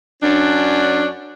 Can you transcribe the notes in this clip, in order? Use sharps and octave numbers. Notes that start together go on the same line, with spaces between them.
F#2 C#4 D4